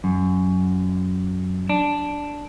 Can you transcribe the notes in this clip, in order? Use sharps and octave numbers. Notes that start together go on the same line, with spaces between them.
F#2
D4